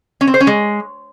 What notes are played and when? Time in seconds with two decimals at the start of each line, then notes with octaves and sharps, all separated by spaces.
0.21 C#4
0.27 C4
0.34 C5
0.40 C#4
0.47 G#3